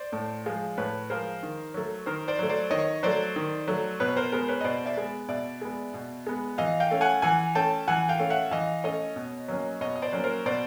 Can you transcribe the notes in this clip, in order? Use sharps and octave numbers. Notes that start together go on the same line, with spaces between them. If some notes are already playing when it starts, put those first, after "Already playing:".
Already playing: C5 D5
A2
F3 G#3
A2 B4 C#5
F3 G#3 A#4 C5
D#3
F#3 A3
D#3 A#4 C5
C5 D5
F#3 A3
C5 D5
D#3 C#5 D#5
F#3 A3 C5 D5
D#3
F#3 A3
B2 B4 C#5
A#4 C5
G#3 B3 A#4 C5
B4 C#5
D#5
B2 C5 D5
D5 E5
G#3 B3
B2 D5 E5
G#3 B3
B2
G#3 B3
E3 D#5 F5
F5 G5
A3 C#4
F#5 G#5
E3 F#5 G#5
A3 C#4 G5 A5
E3 F#5 G#5
F5 G5
A3 C#4
E5 F#5
E3 D#5 F5
A3 C#4 C#5 D#5
B2
F#3 A#3 C#4
B2 C#5 D#5
D#5
C5 D5
F#3 A#3 C#4
A#4 C5
B2 C5 D5